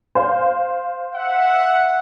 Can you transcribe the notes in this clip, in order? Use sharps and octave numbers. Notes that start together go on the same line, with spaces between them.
C5 F5
E5 F#5